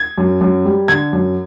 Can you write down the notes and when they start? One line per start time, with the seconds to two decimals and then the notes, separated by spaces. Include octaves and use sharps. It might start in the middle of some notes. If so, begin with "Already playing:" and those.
Already playing: G#6
0.18 F#2
0.41 F#2
0.65 G3
0.88 D3 G#6
1.13 F#2